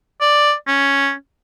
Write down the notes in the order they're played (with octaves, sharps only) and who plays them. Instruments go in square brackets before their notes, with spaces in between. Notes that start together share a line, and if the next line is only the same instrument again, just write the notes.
[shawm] D5
C#4